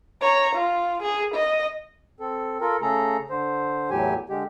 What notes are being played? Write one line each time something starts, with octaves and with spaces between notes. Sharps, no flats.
C#5 A#5
F4
G#4
D#5
C4 A4
F4 A4 A#4
C#3 A3 G#4 A4 A#5
D3 C5
E2 A2 F#3 G4 G#5
D3 G#3 G4